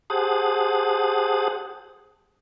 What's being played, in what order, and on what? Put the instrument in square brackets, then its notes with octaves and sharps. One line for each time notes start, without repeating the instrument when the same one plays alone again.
[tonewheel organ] G4 G#4 C5 F#5 A5 D#6